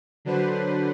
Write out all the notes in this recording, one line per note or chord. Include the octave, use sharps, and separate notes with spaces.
D3 F#3 D4 B4 C5